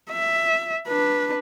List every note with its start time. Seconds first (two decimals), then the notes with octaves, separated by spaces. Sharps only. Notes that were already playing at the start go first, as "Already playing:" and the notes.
0.11 E5
0.87 D4 B4